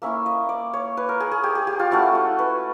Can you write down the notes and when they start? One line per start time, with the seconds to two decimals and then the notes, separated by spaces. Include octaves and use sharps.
0.02 A#3 C#4 E4 E5
0.26 D#5
0.49 D5
0.73 C#5
0.97 B4
1.09 A#4
1.20 G#4
1.32 G#4
1.44 G4
1.55 G#4
1.67 G4
1.80 F4
1.91 A3 C#4 E4 F#4
2.15 F#4
2.39 B4